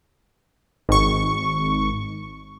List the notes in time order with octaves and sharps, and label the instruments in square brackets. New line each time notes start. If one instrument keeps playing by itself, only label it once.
[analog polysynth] G#1 C#6